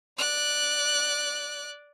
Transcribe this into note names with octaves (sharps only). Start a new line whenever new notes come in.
D5 F#6